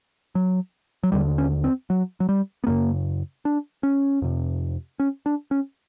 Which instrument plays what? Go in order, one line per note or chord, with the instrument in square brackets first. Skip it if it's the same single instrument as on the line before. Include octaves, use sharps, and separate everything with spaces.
[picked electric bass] F#3
F#3
D#2 D3 G3
C#4
C4
F#3
F#3
G3
B3
F#2 C#3 A#3
D4
C#4
F2 C3
C#4
D4
C#4